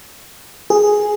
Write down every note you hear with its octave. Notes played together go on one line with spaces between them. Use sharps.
G#4